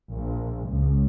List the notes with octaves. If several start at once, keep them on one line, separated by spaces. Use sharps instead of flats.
A#1
C#2